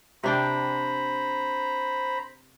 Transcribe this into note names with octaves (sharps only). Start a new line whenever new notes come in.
C3 D4 C5 G5 A#5 B5